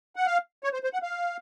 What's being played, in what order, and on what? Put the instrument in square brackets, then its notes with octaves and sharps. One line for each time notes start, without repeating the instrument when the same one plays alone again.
[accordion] F#5
F5
C#5
C5
C5
F#5
F5